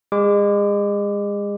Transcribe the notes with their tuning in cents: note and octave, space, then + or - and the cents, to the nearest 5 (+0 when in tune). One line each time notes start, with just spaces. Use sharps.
G#3 -35 D6 +0